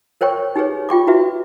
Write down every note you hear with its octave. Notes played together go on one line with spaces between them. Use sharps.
A#4 C5 C#5 G5 C#6
D#4 G4 G#4 B4 C#5
F4 G5 C#6 D6
E4 F#4 B4 E5